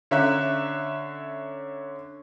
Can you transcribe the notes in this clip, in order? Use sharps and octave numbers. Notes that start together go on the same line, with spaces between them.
D3 C#4 E5 A#5 F#6